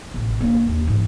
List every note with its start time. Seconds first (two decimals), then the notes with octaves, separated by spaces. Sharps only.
0.14 A1 C3
0.41 A#3 D4
0.67 D#2
0.87 G#2 E3